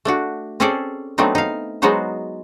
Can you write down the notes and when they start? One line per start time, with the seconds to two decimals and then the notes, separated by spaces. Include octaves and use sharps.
0.05 A3 D4 F#4
0.60 C4 C#4 G#4 A4 C5 D5
1.18 F#3 A3 B3 C4 D4 D#4
1.35 D#4 F5
1.82 F#3 G#3 B3 D#4 F#4 C5